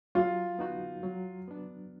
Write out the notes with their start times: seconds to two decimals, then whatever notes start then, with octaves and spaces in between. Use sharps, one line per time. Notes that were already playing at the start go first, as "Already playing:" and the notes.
0.15 F#3 F4
0.59 B3 D#4 F#4
1.03 F#3
1.48 B3 D4